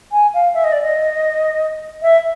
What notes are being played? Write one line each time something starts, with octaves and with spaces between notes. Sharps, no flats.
G#5
F5
E5
D#5
D5
D#5
E5